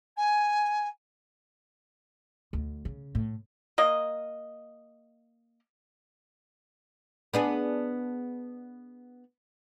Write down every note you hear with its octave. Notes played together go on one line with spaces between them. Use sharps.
G#5
D2
C#3
A2
A#3 D#5
B3 D4 G#4